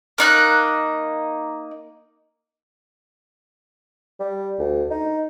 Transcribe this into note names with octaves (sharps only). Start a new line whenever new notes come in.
A#3 D#4 F#6
G3
D2
D#4